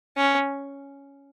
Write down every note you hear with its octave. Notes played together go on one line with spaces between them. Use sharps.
C#4